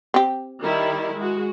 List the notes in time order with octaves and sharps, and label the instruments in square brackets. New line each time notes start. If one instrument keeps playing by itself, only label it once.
[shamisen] C4 G4
[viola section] D#3 G3 E4
G#3 F#4